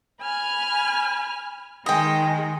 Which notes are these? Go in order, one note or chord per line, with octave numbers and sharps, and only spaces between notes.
G#5 B5 F6
D#3 G#3 D#5 G5